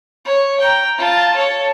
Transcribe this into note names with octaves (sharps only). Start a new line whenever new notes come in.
C#5
G5 A#5
F4 A5
A4 C#5